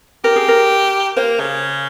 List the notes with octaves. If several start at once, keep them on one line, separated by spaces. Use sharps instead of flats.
G4 A#4
G#4
A#4
A#3 C5
C#3